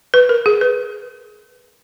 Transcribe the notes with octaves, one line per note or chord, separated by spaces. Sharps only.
B4
A#4
G#4
B4